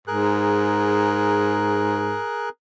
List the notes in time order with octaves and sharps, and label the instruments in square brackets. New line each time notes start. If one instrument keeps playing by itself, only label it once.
[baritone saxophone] G#2 [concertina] G#4 A#4 F#6